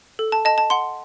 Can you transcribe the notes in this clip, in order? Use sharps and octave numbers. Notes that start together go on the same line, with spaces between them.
A4
A5
D#5 A5
A5
F#5 C6